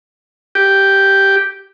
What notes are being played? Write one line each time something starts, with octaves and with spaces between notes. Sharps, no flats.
G4